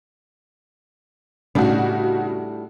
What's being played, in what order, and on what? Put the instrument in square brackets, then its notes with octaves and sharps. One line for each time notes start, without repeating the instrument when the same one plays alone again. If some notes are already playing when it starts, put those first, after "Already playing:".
[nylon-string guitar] A2 G3 D4 [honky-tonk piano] C#3 D#4 F#4